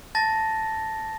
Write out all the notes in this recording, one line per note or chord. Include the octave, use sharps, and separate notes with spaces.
A5 A6 A#6